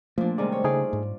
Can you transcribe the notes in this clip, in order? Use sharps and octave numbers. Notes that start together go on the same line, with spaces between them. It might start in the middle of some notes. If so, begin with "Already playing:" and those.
A#2 F3 A3 A#3 D4
C3 D#3 G3 G#3 D5
C#5
C#3 A3 D#4 F4 G#4 D5
G#2